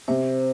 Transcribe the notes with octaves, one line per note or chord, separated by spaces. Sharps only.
C3 C5